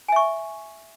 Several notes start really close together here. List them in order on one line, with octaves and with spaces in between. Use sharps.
G#5 E5 C#6